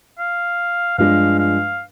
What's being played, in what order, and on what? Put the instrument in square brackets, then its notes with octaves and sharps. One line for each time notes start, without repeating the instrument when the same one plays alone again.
[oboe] F5
[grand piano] G2 F3 G#3 D4 [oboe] F5
[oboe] F5